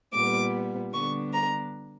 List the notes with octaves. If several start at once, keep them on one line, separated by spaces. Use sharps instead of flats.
A#2 G3 B3 D6
D3 G3 B3 D4 C#6
A#5